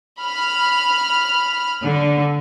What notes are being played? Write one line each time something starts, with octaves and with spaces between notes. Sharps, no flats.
B5 F6
D3